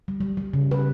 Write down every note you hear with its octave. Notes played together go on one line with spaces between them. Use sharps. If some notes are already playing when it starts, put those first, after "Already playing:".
G3
G3
G3
C#3
B4